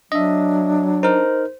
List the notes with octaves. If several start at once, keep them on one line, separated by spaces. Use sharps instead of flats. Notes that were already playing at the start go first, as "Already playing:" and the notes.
F#3 D4 D#5 E5
D#4 A#4 C5